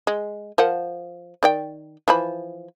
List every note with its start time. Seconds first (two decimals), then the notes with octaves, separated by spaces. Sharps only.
0.07 G#3
0.58 F3 A#4 F#5
1.43 D#3 D5 G5
2.08 E3 F3 B5